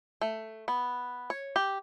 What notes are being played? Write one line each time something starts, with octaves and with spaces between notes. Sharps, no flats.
A3
B3
C#5
G4